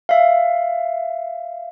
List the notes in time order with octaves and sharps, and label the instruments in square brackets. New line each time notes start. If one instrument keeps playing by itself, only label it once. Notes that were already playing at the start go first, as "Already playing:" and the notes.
[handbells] E5 F5